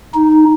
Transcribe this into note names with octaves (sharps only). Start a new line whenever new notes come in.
D#4